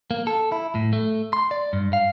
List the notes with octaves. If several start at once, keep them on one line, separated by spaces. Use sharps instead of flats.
A#3
A4
E4
A2
A3
C6
D5
G2
F5